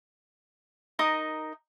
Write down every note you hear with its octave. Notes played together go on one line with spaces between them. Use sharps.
D#4 A#4 D#6